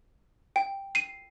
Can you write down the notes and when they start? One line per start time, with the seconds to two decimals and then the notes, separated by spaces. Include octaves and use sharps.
0.56 G5
0.95 C7 D#7